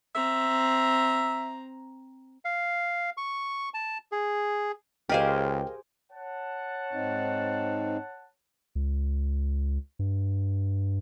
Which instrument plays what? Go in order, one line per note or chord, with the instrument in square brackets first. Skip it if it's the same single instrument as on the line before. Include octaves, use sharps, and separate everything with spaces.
[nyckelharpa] C4 A#5 [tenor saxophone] E5
[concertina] F5
C#6
A5
G#4
[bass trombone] C#2 [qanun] G4 G#4 C5 [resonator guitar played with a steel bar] A#4 D#5 F5 [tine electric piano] G5
[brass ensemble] C#5 F#5 A5
[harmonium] G#2 C4 D#4
[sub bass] C#2
G2